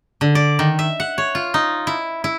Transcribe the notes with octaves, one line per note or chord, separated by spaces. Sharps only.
D3
D5
D#3
E5
F#5
C#5
F4
D#4
E4
E4